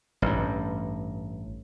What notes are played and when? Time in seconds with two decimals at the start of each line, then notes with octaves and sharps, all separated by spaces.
0.22 A1 G2